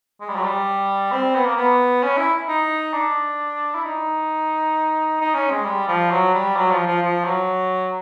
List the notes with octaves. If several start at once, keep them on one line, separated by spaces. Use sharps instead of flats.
G#3
G3
F#3
G3
C4
B3
A#3
B3
C#4
E4
D#4
D4
E4
D#4
D#4
C#4
G#3
G3
F3
F#3
G3
F#3
F3
F3
F3
F#3